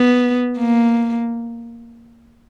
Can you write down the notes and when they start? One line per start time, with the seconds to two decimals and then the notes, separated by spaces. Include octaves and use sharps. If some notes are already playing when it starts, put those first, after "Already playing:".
Already playing: B3
0.58 A#3